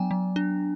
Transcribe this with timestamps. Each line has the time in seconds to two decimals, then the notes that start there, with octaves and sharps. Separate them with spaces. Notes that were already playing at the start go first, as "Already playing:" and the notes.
Already playing: F#3 B3 D4 G5 G#5
0.11 F#3
0.36 D4